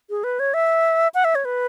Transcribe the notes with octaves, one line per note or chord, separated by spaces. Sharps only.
G#4
B4
C#5
E5
F#5
E5
C#5
B4